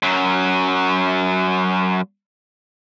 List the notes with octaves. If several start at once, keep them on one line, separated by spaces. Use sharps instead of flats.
F#2 F#3